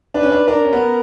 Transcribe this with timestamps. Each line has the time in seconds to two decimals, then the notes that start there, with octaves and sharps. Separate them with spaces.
0.14 D4 B4
0.23 C#4
0.32 D4
0.47 D4 A#4
0.65 C#4
0.73 B3